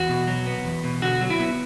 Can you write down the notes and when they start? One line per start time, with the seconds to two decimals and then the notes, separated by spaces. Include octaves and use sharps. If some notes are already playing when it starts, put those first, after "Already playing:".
Already playing: E2 F#4
0.09 B2
0.27 F#3
0.46 B3
0.65 E2
0.84 B2
1.02 D3 F#4
1.21 F#3
1.30 E4
1.40 B3